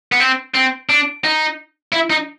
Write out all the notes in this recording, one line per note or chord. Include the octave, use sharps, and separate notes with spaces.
B3
C4
C4
D4
D#4
E4
D#4